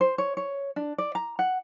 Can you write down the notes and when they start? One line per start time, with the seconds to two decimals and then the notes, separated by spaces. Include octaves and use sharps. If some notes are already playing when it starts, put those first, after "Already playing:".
0.01 C5
0.18 C#5
0.37 C#5
0.76 D4
0.98 D5
1.15 A#5
1.39 F#5